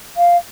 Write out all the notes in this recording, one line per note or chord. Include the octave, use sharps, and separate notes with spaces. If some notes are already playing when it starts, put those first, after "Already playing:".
F5